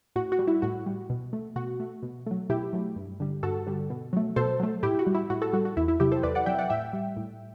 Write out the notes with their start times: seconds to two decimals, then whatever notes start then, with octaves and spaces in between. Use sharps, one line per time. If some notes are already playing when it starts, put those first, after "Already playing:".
0.16 A2 F#4
0.32 F#4
0.39 G3
0.48 E4
0.62 A2 F#4
0.86 G3
1.10 B2
1.33 A3
1.56 B2 F#4
1.80 A3
2.03 B2
2.27 F#3 A3
2.50 B2 E4 G4
2.73 F#3 A3
2.96 G2
3.20 D3 G3
3.43 G2 F#4 A4
3.67 D3 G3
3.90 B2
4.13 F#3 A3
4.36 B2 A4 C5
4.60 F#3 A3
4.83 A2 E4 G4
4.99 F#4
5.07 G3
5.15 E4
5.30 A2 F#4
5.42 F#4 A4
5.53 G3 F#4
5.65 F#4
5.77 E2 E4
5.88 E4
6.00 C3 F#3 E4 G4
6.12 A4 C5
6.23 E2 B4 D5
6.35 D5 F#5
6.46 C3 F#3 E5 G5
6.59 D5 F#5
6.70 A2 E5 G5
6.93 G3
7.17 A2